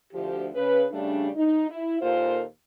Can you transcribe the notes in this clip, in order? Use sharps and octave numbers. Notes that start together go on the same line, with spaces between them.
D2 F3 G4
C#3 B4
C#3 G3 A3 D4
D#4
E4
D#2 A#2 F4 A4 A#4 C5